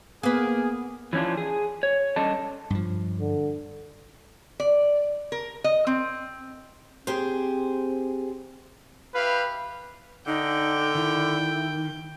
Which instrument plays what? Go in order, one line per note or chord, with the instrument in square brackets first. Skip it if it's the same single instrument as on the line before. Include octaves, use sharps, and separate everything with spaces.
[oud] A#3 B4 [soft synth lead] B3 [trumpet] G#4
[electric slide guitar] E3 F3 C#4 D4 F4
G#4
C#5
G3 C#4 D4 A4 D#5 A5
[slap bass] G2 F3
[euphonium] D3
[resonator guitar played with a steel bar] D5
A#4
D#5
C4
[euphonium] C4 [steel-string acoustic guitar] G4 G#4 C5
[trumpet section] E4 G4 F5 [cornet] B4
[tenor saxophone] D3 [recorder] D#4 [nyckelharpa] G5
[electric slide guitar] D#3 [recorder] E4